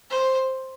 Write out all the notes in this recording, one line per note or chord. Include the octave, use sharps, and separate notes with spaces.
C5